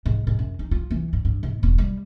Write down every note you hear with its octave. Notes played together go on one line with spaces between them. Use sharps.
G#2
G#2
F#2
D#4
F4
E3
G2
G2
G#2
E1
G3